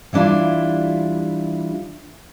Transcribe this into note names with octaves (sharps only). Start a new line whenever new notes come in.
E3 G3 D4 E4 F4